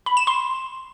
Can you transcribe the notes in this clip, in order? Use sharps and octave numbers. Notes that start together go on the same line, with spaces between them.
B5
E7
C6